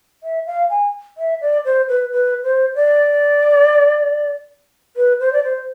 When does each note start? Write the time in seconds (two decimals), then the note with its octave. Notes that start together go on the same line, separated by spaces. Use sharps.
0.23 E5
0.46 F5
0.70 G#5
1.18 E5
1.41 D5
1.65 C5
1.89 B4
2.12 B4
2.43 C5
2.75 D5
4.96 B4
5.20 C5
5.33 D5
5.44 C5